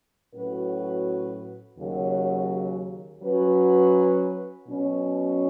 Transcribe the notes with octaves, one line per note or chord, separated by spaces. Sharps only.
A2 F#3 C#4 F#4 B4
D#2 C#3 F#3
F#3 C#4 F#4 B4
B2 F#3 C#4